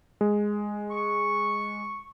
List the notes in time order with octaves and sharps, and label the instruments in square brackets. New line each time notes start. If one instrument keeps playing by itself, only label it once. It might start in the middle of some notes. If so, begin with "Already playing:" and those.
[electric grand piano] G#3
[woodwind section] C#6